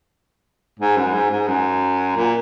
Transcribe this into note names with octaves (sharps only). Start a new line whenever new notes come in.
G#2
F#2
G#2
G#2
F#2
A#2